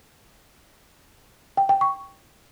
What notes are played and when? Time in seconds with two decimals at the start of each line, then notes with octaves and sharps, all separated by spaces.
1.57 G5
1.69 G5
1.81 C#6